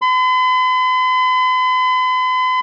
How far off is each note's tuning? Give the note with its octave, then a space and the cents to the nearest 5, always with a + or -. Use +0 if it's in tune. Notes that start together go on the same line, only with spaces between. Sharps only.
B5 +45